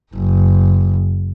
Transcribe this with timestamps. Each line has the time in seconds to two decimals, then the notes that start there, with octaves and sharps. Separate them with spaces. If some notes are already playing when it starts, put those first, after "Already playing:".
0.14 F#1